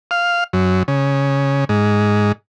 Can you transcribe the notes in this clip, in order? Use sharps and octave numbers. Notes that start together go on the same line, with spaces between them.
F5
F#2
C#3
G#2